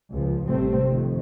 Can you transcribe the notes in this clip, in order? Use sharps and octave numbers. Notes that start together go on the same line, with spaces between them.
C#2 F3
A1 C3 G3 A3 C4
F2 D#3